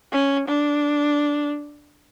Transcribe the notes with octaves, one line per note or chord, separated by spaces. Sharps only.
C#4
D4